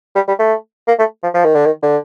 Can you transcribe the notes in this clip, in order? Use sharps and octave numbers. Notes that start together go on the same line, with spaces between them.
G3
G3
A3
A#3
A3
F3
F3
D#3
D3
D#3
D3